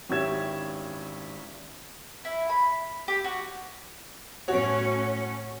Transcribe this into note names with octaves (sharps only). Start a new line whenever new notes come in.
G#1 C#4 E4 G4 G#6 E7
E4
B5
G4
F#4
A2 C#4 F#4 C#5